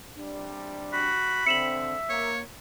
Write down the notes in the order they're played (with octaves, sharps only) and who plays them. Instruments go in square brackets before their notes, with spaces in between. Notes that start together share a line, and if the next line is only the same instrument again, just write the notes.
[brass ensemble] C3 G3 D4
[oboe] F#4 [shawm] B5
[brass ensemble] D3 C4 [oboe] E5 [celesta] C#7 E7 F#7
[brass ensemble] A#3 [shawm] C#5